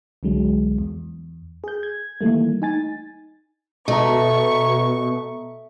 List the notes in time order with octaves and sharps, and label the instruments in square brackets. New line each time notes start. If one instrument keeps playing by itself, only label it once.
[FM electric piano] C2 D3 F#3 G#3
E2
G#4 G6
G#6
D#3 E3 G3 A3 A#3
D#4 G#5 A6
[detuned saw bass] B2 [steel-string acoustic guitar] A3 [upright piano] D#5 A#5 [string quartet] C#6